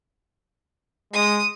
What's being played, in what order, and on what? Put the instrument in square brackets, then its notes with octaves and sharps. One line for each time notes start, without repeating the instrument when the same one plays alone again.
[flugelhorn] G#3 [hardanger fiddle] D#6